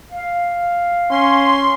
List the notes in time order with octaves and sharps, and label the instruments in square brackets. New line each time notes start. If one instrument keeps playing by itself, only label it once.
[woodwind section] F5
[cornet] C#4 [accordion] C6